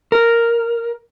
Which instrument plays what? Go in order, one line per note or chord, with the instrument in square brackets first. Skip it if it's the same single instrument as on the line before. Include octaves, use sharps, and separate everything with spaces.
[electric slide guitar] A#4